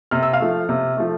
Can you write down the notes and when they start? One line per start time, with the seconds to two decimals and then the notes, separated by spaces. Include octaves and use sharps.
0.11 C3 F6
0.23 E6
0.33 F5 F6
0.40 F3 A3
0.69 C3
0.97 F3 A3